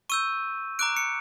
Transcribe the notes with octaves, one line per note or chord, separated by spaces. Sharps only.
C#6 E6 G6 D#7
A#5 D6 F#6 D7
C#7